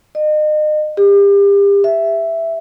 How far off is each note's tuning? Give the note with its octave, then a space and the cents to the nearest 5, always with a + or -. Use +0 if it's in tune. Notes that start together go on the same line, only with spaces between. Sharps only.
D#5 -35
G4 +35
E5 +5